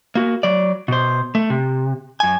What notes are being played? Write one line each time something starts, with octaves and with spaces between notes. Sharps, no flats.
A#3 F#4
F#3 D5
B2 C5
A3
C3
F#2 G#5